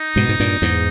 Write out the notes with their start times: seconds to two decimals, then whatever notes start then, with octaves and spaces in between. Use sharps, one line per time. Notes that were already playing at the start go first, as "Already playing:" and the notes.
Already playing: D#4
0.16 G#2 B2
0.29 G#2
0.40 G2 A#2
0.62 E2 G#2